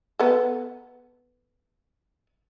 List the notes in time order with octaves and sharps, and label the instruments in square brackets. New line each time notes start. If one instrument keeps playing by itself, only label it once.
[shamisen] B3 A4